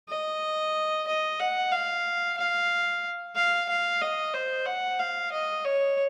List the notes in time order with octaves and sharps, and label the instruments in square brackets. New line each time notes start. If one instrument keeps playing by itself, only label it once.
[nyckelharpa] D#5
D#5
F#5
F5
F5
F5
F5
D#5
C5
F#5
F5
D#5
C#5